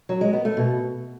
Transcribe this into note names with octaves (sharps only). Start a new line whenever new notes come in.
F#3
G#3
B3
A3
B2